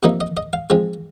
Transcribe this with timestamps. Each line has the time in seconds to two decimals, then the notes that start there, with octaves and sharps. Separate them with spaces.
0.03 C3 F3 A#3 D#4 D#5
0.21 D#5
0.37 D#5
0.53 F5
0.70 F3 G#3 C4